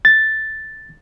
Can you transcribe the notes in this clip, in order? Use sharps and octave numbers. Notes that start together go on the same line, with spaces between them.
A6